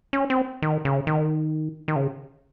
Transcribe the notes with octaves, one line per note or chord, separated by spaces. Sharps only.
C#4
C4
D#3
C#3
D#3
D#3
C#3